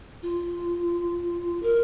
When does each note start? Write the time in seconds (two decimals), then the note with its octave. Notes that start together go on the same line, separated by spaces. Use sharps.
0.22 F4
1.62 A#4